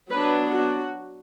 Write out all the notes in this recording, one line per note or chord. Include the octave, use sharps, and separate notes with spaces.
F#3 B3 D4 B4
F#4